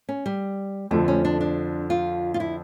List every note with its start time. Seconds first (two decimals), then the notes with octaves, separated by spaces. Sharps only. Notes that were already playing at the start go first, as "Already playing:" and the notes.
0.09 C#4
0.26 G3
0.91 F2 D3 F3 A3
1.08 C#4
1.25 D4
1.41 D4
1.90 F4
2.34 F4
2.40 E4